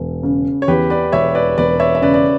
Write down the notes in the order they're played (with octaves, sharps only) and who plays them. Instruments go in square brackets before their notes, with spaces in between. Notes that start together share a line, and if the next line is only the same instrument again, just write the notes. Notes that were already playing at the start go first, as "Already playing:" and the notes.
Already playing: [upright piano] E1
C#3
[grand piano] C#5
[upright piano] E2 [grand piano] G4 B4
[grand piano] B4 D5
[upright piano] E1 [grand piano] C#5 E5
[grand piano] B4 D5
[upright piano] E1 [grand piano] B4 D5
[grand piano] C#5 E5
E5
[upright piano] C#3 [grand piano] B4 D5
[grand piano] D5